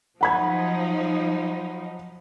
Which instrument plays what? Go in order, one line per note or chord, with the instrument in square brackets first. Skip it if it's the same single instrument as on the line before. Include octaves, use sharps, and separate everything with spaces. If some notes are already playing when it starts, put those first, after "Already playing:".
[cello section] F3 F#3 D#4 [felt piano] F#5 B5 G#6